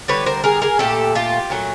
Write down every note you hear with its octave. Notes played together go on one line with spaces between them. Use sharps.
D3 G3 B4 C#5
A#4 C5
G#4 A#4
G#4 A#4
A#2 F#3 A3 G4 A4
F4 G4
A#2 F#3 A3